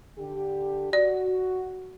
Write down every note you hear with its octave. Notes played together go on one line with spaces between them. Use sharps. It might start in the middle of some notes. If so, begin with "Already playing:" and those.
D3 G4
F#4 D5